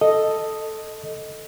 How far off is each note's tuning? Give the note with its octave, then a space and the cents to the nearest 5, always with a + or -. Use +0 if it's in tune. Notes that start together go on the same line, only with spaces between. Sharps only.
A4 +5 D#5 +0